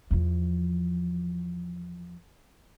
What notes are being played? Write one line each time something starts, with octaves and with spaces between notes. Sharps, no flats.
E2 F3